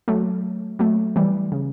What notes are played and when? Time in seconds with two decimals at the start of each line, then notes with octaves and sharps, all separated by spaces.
0.08 F#3 A3
0.79 F#3 A3
1.16 E3 G3
1.52 C#3